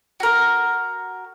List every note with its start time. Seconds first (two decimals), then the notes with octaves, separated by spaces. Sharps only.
0.20 F#4 A#4